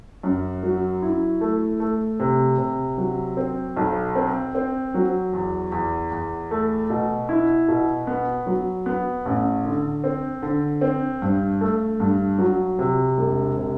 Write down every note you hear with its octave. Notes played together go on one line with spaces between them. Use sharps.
F#2
F#3
E4
A3
A3
C3
C3
F#3
C4
B1
C4
C4
F#3
E2
E2
E2
A3
B2
E4
B2
B3
F#3
B3
A1
D3
C4
D3
C4
G2
A3
G2
F#3
C3
E1
C3